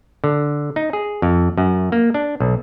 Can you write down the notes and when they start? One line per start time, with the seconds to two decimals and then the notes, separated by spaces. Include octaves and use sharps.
0.24 D3
0.76 D#4
0.93 G#4
1.22 F2
1.58 F#2
1.92 A#3
2.14 D4
2.40 B1